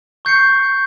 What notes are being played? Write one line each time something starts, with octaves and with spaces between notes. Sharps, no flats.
C#6 G6 C7 C#7